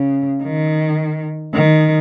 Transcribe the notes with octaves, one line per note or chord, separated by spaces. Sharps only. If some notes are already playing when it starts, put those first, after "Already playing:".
Already playing: C#3
D#3
D#3